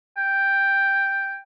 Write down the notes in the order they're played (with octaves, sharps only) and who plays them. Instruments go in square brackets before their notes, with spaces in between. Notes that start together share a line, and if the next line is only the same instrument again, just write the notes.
[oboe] G5